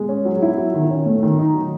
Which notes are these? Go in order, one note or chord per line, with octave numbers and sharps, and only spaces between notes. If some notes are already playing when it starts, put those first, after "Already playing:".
Already playing: G#3
C#4
F#3
E4
F#3
D#3
C#4
A3
D#3
D#4
F#3